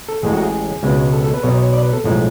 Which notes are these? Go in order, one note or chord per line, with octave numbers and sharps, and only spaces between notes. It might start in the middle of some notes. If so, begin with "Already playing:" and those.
A4
A1 A2 G#3 G#4
F#4
G#4
C#2 B2 G#3
A4
A4
B4
B1 B2 F#3 C#5
C#5
D5
B4
A4
B1 A2 F3 G#3